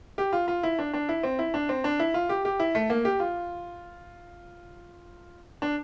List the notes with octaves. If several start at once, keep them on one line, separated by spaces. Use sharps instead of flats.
G4
F4
F4
E4
D4
D4
E4
C4
E4
D4
C4
D4
E4
F4
G4
G4
E4
A3
A#3
G4
F4
D4